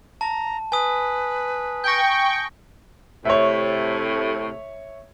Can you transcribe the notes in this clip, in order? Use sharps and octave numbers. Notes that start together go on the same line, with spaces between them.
A5 A#5
B4 G#5 D#6
G5 C#6 G6 A#6
A2 C3 A3 C#5 E5